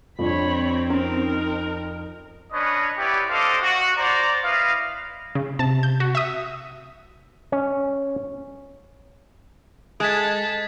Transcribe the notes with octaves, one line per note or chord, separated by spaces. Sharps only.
F2 F3 C4 D4 C#5 B5
C#4 D#4 A#4
C#4 D4 B4 C#5 D#5
B3 E4 G4 B4 C#5 D5
D4 A4 C5 D#5 F5 D6
F#4
C5 D5 A#5
E4 B4 D#5 F5
C#3
C3 A5
G6
F#4
E5 D#6
C#4
G#3 A4 D#5 A5 D#6 G#6 B6